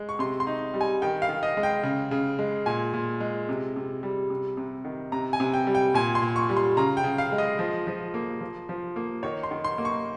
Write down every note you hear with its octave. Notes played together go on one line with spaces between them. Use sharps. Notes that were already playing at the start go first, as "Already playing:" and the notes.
Already playing: G#3
C#6
C3 C6
C6
D#4
G3
G#5
D#3 G5
F5
D#3
D#5
G#3
G5
C#3
C#3
G#3
A#2 G#5
A#2
G#3
C3
C3
G3
C3
C3
D#3
C3 A#5
G#5
C3
G5
G3
G5
A#2 G#5
C6
A#2
C#6
G3
C6
C#3 A#5
G5
C#3
F5
G#3
D#5
F3
F3
A#3
F3
F3
A#3
D#3 C#5
C6
D#3
C6
A#3
C#6